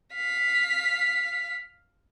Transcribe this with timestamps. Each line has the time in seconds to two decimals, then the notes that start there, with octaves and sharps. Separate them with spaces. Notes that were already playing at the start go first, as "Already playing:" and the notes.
0.14 F5 B6